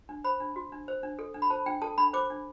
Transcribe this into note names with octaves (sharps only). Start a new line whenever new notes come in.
D4
C5 B5
D4
F#4
D4
C5
D4
A4
D4
B5
C5 A5
D4 G5
A4 A5
D4 B5
C5 D6
D4